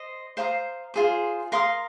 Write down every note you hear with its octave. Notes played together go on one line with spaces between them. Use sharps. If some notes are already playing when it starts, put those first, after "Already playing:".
Already playing: C5 D#5
C5 F5 A#5 D#6
F4 G#4 C5
A#4 F5 C6 D#6